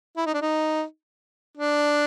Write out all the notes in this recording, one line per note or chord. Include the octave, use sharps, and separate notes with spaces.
E4
D#4
D4
D#4
D4